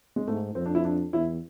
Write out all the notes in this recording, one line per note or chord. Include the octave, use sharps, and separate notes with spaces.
G#3
G#2 A3
F2 C4
D4
E4
D4
E2 E4